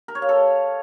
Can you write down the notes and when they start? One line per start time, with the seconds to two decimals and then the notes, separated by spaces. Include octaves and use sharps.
0.08 A#4
0.15 C#5
0.22 F5
0.29 A4